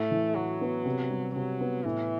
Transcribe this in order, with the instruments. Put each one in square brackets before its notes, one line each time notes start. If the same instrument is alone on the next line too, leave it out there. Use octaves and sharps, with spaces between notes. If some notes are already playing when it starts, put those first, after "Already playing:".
Already playing: [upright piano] A2 [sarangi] A3
[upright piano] E3
[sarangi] F#3 [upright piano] F#4
[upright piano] B3
C3
G3
[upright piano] C3 [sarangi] F#3
[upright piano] B3
[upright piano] A2 [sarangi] E3